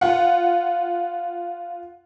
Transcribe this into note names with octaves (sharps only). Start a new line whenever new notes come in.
F4 F#5